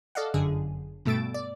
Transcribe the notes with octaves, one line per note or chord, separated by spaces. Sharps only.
A4 D5 D#5 F5 F#5
G1 F#2 D3 G#4
G2 B2 A3 E6 A6 D7
D5